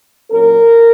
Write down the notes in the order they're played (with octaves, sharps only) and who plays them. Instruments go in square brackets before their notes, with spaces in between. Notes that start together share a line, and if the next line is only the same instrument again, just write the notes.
[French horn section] A#2 F#3 C#4 A#4